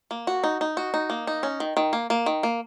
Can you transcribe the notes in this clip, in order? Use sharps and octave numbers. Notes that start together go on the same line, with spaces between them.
A#3
F#4
D#4
D#4
F#4
D#4
A#3
D#4
C#4
D#3
D#3
A#3
A#3
D#3
A#3